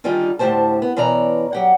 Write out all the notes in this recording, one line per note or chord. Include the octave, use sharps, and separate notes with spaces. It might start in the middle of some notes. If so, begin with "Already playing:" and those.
D3 D#3 G3 D#4 F4 G#4
D2 A2 G#3 G4 C5 A5
B3
B2 E3 C#4 D5 A#5
F#3 G4 F#5